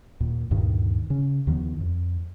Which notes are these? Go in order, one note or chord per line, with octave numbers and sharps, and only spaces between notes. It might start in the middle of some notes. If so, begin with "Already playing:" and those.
D#2 A#2
D2 G2 A#2 D#3
C#3 C#4
D#2 D#3 F3 B3
F2